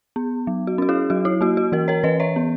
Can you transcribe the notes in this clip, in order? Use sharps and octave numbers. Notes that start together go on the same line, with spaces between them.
B3
F#3
F#4
C#4 F#4
E4 G#4
F#3 F#4
E4
A#3 F#4
F#4
E3 F#4 A#4
A#4 C#5
E3 B4 D#5
C#5 E5
B3